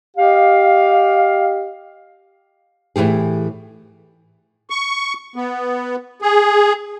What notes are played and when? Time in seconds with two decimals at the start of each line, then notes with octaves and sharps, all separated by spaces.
0.17 G4 D#5 F5
2.96 A2 E3 F3 G4 G#4
4.70 C#6
5.36 B3
6.22 G#4